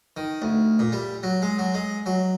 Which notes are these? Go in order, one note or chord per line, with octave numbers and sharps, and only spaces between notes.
D#3
D2
A#2
G3
F#3
G#3
F#3
G#3
F#3